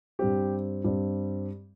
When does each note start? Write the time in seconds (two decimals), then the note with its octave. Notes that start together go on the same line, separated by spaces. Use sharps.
0.19 G2 G3 C4 G4
0.84 G2 G3 C4